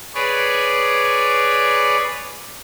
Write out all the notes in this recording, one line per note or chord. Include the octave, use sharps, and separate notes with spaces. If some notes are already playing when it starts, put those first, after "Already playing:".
G#4 B4 C#5 D5